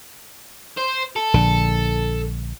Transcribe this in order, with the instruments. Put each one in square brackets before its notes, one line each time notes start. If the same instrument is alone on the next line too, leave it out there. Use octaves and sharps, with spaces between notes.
[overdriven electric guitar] C5
A4
[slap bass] A#1 D3